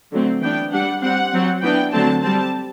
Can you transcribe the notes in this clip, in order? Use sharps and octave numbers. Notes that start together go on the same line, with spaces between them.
D3 F#3 A3 C4
E3 B3 D4 G5
G3 D4 F#5
G3 C4 F#5
F#3 C4
E3 B3 D4 G5
D3 F#3 A3 C4 A5
G3 C4 A5